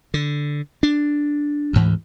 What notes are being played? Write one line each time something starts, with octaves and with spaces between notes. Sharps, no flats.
D3
D4
D2 G#2 E3